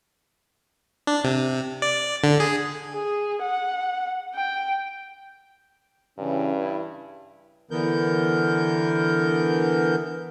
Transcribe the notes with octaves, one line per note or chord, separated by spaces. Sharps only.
D4
C3
D5
D3
G#4
G#4
F#5
G5
G2 C#3 E3 C#4
E4
D3 E3 B3 A#4 G6